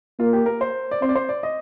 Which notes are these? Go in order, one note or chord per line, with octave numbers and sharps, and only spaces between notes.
A#3 F4
G4
A#4
C5
D5
C4 C5
D5
C5
D5
D#5